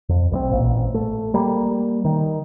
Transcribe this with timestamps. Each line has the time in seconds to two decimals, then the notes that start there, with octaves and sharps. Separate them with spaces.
0.09 F2
0.31 B1 G3 C4
0.51 A1 A#2
0.94 A3
1.34 G3 A#3
2.05 D#3